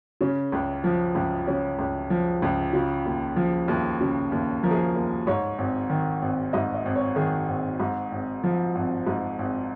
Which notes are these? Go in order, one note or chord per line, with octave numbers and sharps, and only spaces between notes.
C#3 C#4
C#2
F3
C#2
C#3 C#4
C#2
F3
C#2
C#3 F4
D#2
F3
D#2
C#3
D#2
F3 A#4
G#4
A#4
D#2
G#2 C#5
G#1
D#3
G#1
G#2 D#5
D#5
G#1
C#5
D#3 G#4
G#1
G#2
G#1
F3
G#1
G#2
G#1